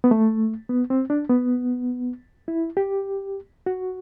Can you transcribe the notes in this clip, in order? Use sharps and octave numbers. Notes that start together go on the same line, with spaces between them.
B3
A3
B3
C4
D4
B3
E4
G4
F#4